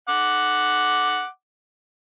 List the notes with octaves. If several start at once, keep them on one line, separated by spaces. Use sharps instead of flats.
F#5 D6